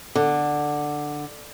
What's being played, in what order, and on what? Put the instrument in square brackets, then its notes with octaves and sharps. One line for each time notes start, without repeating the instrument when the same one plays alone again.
[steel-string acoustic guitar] D3